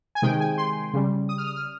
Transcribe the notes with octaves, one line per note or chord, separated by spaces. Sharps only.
G#5
C3 D#3 G#3 G5
G#5
C6
C#3 G3
D#6
F6
D#6
F6